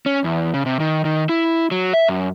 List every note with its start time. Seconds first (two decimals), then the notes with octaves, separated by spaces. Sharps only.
0.06 C#4
0.24 E2
0.54 C#3
0.66 C3
0.80 D#3
1.05 D#3
1.29 E4
1.71 F#3
1.94 E5
2.08 F#2